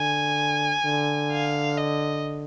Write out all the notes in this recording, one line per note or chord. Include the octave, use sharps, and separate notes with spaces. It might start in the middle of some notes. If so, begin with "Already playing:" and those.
Already playing: D3 G#5
D3
F5
D#5